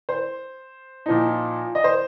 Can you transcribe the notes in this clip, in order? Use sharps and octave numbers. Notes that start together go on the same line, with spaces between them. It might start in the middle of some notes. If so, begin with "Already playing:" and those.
C5
A#2 F3 D#4
D#5
C5